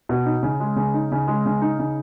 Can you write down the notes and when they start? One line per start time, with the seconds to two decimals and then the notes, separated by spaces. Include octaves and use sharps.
0.09 B2
0.26 D#4
0.43 C#3
0.60 G#3
0.76 C#3
0.94 D#4
1.12 C#3
1.27 G#3
1.46 C#3
1.62 D#4
1.79 C#3